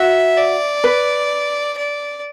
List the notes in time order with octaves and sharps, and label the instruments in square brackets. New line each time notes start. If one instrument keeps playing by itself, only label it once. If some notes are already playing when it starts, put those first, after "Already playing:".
Already playing: [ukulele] F#4 [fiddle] E5
[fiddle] D5
[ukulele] B4
[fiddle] D5